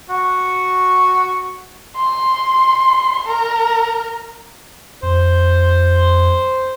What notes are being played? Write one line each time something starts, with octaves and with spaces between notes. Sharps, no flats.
F#4 C#6
C6
A#4
F2 C5